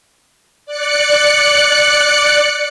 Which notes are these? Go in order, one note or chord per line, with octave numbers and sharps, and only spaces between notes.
D5 F#6 C#7